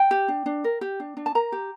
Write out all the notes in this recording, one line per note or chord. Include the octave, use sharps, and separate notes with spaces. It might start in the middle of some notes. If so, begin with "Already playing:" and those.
Already playing: G5
G4
D4
D4
A#4
G4
D4
D4
A5
A#4 A#5
G4